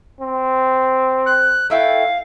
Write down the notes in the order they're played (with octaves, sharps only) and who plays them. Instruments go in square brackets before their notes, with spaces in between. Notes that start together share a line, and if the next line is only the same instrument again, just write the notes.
[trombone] C4
[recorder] F#6
[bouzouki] A3 E4 G5 [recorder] F5